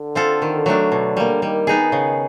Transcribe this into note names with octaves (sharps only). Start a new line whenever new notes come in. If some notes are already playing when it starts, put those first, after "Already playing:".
Already playing: D3
C4 F4 A4
D#3
F#3 A3 D4
B2
G3 A#3
D#3 G3
B3 D#4 G#4
C#3